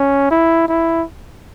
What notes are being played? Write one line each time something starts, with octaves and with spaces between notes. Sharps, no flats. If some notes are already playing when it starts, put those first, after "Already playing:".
Already playing: C#4
E4
E4